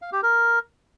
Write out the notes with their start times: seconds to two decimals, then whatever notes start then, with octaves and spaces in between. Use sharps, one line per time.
0.02 F5
0.12 G4
0.23 A#4